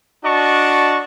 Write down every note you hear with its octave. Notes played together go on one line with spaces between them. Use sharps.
D4 F#4 D5 D#5 A5 C#6